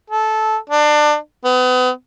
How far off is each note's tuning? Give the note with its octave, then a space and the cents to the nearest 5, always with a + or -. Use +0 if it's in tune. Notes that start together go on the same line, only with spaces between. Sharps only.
A4 -15
D4 +25
B3 +35